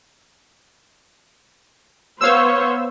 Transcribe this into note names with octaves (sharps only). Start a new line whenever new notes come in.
B3 C5 C#5 F5 E6